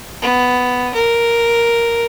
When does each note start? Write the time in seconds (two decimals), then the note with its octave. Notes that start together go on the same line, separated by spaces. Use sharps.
0.22 B3
0.94 A#4